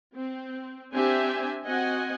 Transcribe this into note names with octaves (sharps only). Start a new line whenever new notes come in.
C4
C4 D4 G4 C5 E5 G#5
C4 F#4 D#5 F#5 G#5